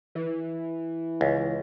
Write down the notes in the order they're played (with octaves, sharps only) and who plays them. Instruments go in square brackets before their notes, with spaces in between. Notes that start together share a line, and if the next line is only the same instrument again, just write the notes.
[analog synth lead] E3
[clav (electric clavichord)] C#2